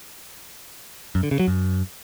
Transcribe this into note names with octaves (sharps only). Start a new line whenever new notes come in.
F#2
D3
C#3
F#3
F#2